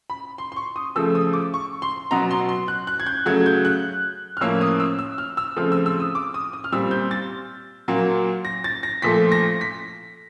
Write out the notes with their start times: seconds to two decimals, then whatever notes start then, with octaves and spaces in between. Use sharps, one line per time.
0.10 B5
0.38 C6
0.52 C6
0.56 C#6
0.76 D#6
0.95 C#3 F3 A3 E6
1.15 D#6
1.33 D6
1.54 C#6
1.82 C6
2.11 B2 F#3 B3 A#5
2.31 C6
2.49 C6
2.68 F#6
2.87 F#6
3.00 G#6
3.07 G6
3.26 C#3 F#3 A3 G#6
3.46 G6
3.65 F#6
4.37 F6
4.41 A2 F3 A#3 C#4 E6
4.61 D#6
4.80 E6
4.99 E6
5.18 F6
5.37 E6
5.56 C#3 F3 A3 C4 F6
5.72 E6
5.86 E6
6.00 D#6
6.15 D6
6.34 D#6
6.53 D#6
6.64 F6
6.72 A#2 G3 C4 E6
6.91 G6
7.11 A6
7.88 A#2 F#3 A#3
8.45 A#6
8.64 A6
8.83 A#6
9.02 A#2 F3 A3 B6
9.32 A#6
9.61 B6